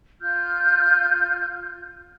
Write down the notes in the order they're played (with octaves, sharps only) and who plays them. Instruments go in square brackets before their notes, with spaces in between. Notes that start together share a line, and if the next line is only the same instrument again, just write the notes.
[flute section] F4 F6 G6